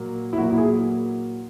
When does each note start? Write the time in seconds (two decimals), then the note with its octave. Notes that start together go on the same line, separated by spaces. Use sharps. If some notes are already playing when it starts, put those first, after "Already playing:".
Already playing: A#2 F#3 A#3
0.33 E4
0.38 A#2 F#3 A#3 F#4
0.50 E4
0.58 G#4